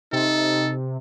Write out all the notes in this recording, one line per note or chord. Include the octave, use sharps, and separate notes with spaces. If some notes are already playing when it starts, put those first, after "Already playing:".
C3 D#4 A4